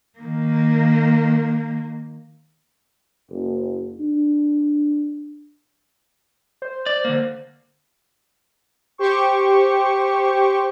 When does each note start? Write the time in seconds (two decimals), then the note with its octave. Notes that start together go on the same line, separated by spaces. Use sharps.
0.19 D#3 A#3
3.30 F#1
4.00 D4
6.62 C5
6.86 D5
7.05 D3 A#3
8.98 G4 C5 C#6